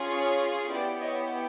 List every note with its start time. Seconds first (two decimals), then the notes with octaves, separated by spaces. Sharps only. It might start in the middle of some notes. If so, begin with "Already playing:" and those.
Already playing: C#4 F4 G#4
0.10 C#5
0.70 B3 E4 G4 D5
1.00 C#5 D#5